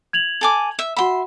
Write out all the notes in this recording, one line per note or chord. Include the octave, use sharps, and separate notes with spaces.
G#6 F7 F#7
A4 G#5 D6
E5
F#4 E5 F#5 B5 C6